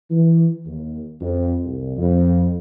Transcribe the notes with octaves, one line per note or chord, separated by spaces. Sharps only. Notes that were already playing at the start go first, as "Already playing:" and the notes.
E3
D#2
F2
C2
F2